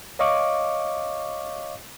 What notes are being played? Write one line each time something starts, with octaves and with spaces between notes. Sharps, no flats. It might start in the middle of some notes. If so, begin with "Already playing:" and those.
C#5 D#5 F5 C#6 D6